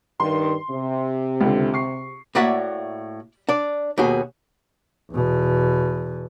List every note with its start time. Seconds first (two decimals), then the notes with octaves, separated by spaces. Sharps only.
0.20 G2 D#3 C6
0.71 C3
1.40 C#2 D3
1.74 C#6 C7
2.35 A2 A#3 F#4 D5 E5 F#5
3.49 D4 D5
3.98 D#2 B2 F#4 G#4
5.12 E2 B2